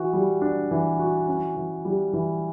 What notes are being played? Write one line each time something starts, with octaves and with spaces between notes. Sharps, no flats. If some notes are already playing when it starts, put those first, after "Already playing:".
Already playing: E3 F#4
G3
D4
E3
F#4
C#4
E3
G3
E3